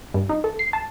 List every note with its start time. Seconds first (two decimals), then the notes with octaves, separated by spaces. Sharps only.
0.14 G2
0.29 D#4
0.44 A4
0.59 C7
0.73 A5